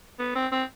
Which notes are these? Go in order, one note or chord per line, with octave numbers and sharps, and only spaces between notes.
B3
C4
C4